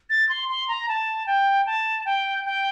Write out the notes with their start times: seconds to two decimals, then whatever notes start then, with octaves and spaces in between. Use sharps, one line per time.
0.10 A6
0.29 C6
0.49 C6
0.68 A#5
0.89 A5
1.27 G5
1.66 A5
2.06 G5
2.46 G5